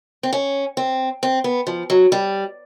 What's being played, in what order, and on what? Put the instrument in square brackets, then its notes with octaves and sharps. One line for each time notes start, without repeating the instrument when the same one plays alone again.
[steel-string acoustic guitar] C4
C#4
C4
C4
B3
F3
F#3
G3